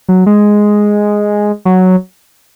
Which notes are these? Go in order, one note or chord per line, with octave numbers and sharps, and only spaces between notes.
F#3
G#3
F#3